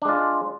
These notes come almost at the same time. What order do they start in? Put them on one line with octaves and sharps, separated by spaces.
D4 G#3 F4